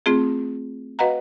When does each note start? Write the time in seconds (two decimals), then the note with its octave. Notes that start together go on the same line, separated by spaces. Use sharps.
0.06 A3 C4 F4 G#4
0.99 F#4 B4 D#5 F5 F#5 A#5